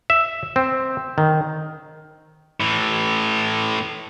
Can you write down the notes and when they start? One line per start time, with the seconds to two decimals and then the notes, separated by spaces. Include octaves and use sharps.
0.10 E5
0.56 C4
1.18 D#3
2.60 A2 E3